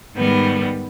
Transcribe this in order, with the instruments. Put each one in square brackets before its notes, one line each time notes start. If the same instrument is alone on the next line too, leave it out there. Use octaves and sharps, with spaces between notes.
[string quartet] G#2 D#3 G3 B3